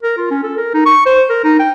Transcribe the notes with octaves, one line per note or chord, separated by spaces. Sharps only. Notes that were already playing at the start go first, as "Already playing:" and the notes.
A#4
F4
C#4
A4
A#4
D#4
C#6
C5
A#4
D#4
G5